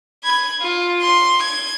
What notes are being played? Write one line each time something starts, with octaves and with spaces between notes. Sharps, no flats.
B5 G#6
F4
C6
G#6